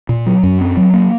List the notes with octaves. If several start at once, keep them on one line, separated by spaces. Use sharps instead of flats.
A#2
F#3
F#2
C4
F#3
A#3